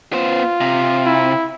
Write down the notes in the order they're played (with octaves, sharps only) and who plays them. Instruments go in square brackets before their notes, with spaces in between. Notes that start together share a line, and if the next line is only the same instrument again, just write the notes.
[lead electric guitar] B3 C5 [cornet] F4
[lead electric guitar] C3
[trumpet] E4